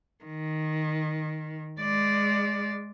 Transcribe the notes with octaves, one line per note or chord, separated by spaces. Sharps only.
D#3
G#3 D5